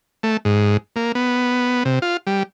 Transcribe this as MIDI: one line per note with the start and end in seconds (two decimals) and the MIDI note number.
0.23 0.37 57
0.45 0.77 44
0.96 1.12 58
1.15 1.83 59
1.85 1.99 48
2.02 2.17 65
2.27 2.43 55